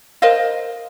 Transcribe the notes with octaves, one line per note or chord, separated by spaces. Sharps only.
A#4 C5 D#5 F5